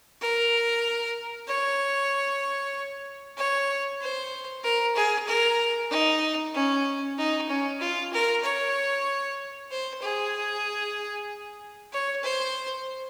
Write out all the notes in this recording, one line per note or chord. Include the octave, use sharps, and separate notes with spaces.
A#4
C#5
C#5
C5
A#4
G#4
A#4
D#4
C#4
D#4
C#4
F4
A#4
C#5
C5
G#4
C#5
C5